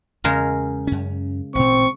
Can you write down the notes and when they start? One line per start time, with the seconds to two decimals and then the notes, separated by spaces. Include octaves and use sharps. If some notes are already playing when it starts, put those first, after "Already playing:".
0.24 E2 C#3 G#3 A#4
0.87 F#2 C#4
1.55 A1 A#2 C4 C#6